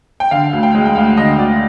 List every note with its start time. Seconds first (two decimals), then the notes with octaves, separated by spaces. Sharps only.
0.20 G5
0.31 D3 F5
0.53 D2
0.63 G5
0.75 G#3
0.86 G5
0.96 D2 F5
1.17 D3 D#5
1.39 D2 D5